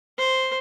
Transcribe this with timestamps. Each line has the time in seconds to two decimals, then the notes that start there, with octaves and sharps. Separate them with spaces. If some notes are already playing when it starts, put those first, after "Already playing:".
0.18 C5